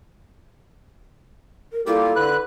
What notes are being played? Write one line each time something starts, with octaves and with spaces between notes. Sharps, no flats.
A#4
G3 A#3 E4 F4 G4 A4
D3 B4 F#6